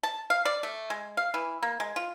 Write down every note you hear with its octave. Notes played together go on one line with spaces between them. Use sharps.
A5
F5
D5
A3
G#3
F5
E3
A#3
G#3
F4